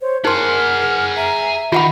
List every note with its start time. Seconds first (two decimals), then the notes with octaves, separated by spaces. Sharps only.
0.01 C5 C#5
0.25 D#4 G#4 A#4 F#5 C6 F6
1.16 E5 A#5
1.72 D#3 F4 F#5 B5